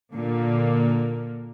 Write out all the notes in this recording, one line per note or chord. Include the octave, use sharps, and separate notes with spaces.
A#2 D3 A#3